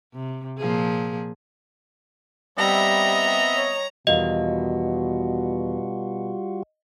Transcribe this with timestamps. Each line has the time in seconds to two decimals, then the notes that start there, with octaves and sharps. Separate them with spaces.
0.13 C3
0.59 A#2 F3 G#4
2.59 G3 B3 C4 D#5 E5 A#5
3.56 C#5
4.07 E2 B2 D#3 G3 F4 F#4 D#5 F5